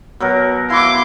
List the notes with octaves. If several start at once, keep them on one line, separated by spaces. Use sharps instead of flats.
B2 F#3 A#4
E4 F5 C6 D6